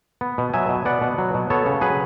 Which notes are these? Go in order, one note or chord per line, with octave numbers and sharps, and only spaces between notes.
B3
B2
F#3 E5 G#5
B2
B3 D5 F#5
B2
F#3
B2
B3 A4 C#5
C#3
F#3 G#4 B4